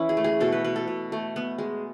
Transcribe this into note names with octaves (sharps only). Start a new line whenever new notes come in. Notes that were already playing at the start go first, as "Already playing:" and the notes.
Already playing: E3 C#4 E4
G#4
A3
G#4
B2 A4
B4
B2 B4
A4
B2
A3
B3
G#3